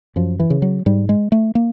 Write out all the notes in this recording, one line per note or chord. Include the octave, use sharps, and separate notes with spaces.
F#2 F3
E3
C#3
F#3
G#2 G3
G#3
A3
A#3